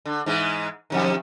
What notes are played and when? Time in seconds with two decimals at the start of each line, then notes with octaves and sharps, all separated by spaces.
0.06 D3
0.26 G#2 E3 G#3
0.90 F2 C3 D#3